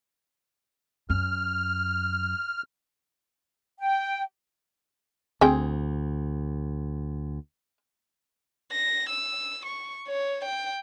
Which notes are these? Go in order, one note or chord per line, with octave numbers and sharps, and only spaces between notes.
F#2 F6
G5
D2 C4 G#4 G5
A#6
E6
C#6
C#5
G5